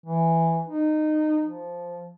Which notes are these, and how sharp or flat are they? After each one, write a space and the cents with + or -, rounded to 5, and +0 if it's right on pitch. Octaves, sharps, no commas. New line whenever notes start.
E3 +5
D#4 -20
F3 -5